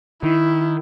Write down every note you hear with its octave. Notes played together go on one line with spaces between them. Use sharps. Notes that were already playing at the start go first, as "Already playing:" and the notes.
D#3 E4